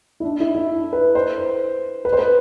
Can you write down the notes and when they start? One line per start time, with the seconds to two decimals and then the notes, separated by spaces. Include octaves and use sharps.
0.20 E4
0.24 D4
0.40 E4
0.55 E4
0.93 B4
1.15 C5
2.05 B4
2.13 C5
2.19 B4